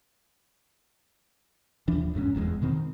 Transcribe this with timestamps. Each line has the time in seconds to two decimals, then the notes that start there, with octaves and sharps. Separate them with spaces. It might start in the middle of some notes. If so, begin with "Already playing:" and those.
1.88 D#1 E3 F3 D4
2.14 F1 G#2 B2 C#4
2.35 F1 E2 B2 G#3
2.62 B2 D#3 C4